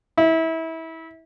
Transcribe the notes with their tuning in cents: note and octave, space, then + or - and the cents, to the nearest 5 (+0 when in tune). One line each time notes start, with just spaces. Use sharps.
E4 -25